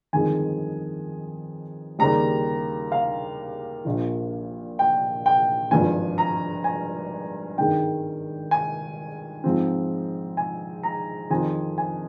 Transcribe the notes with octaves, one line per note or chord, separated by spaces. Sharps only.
G1 F2 D#3 G#3 G#5
D#2 C#3 G3 A#5
F5
A#1 A#2 F3
G5
G5
G#1 G2 F3 G#5
A#5
G#5
G#1 G2 D#3 G#3 G5
G#5
G#2 F3 C4
G#5
A#5
F2 D#3 G#3 C4 G#5
G#5